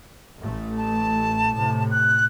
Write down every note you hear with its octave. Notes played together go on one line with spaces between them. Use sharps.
A1 A3
A5
A2 C3
F#6